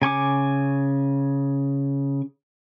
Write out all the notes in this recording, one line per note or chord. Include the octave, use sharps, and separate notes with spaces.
C#3 G#5 C#6 D6